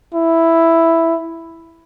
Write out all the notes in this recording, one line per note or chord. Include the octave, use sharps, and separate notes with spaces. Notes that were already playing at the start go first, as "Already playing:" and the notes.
E4